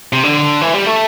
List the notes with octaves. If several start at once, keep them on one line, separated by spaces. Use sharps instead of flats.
C3
D3
E3
G3
A3